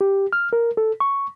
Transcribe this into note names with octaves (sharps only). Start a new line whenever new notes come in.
G4
F6
A#4
A4
C#6